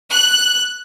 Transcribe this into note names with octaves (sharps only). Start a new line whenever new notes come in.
F#6